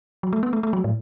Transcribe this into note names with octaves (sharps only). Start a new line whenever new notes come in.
F#3
A3
B3
A3
A3
F#3
A2